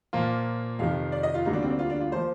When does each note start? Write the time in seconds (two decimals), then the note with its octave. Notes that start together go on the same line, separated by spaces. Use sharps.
0.13 A#2 F3 A#3 F4
0.79 F2 C3 D#3 F5
1.12 D5
1.23 D#5
1.34 F4
1.45 D2 D3 G3 A#3 D#4
1.53 D4
1.63 C4
1.70 D4
1.79 F4
1.90 D4
2.01 F4
2.12 F3 A#3 C5